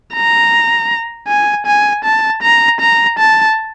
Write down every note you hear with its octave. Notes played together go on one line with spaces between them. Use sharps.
A#5
G#5
G#5
A5
A#5
A#5
A5